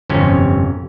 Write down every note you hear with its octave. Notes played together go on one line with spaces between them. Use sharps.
G1 F2 C3 C#4